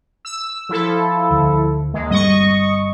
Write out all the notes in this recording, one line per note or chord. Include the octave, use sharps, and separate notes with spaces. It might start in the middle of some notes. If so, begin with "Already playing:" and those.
E6
F3 E4 A4
D2
D#2 G#3
G1 G3 C4 D#5 C#6